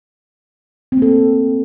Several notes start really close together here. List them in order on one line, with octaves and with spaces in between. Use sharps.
C4 A#3 A4